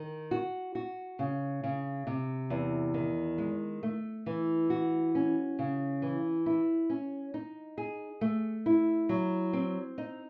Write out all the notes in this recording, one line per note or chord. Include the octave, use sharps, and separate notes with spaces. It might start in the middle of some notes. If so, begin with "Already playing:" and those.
Already playing: D#3
F#4
F#4
C#3
C#3
C3
E2
D#3
G#3
A3
E3
F#4
C#4
C#3
E3
E4
C#4
D#4
G#4
A3
E4
F#3
C4
D#4